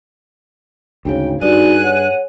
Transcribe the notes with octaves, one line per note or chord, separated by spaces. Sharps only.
D2 G#2 C#3 G5
G2 D#4 F#4 G#4 D5 F#6 D#7
C#5 F#5